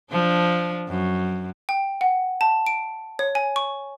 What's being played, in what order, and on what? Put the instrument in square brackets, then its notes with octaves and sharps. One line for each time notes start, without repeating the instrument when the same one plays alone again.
[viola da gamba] F3 D4
F#2
[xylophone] G5
F#5
A5
D7
C#5
G#5
C#6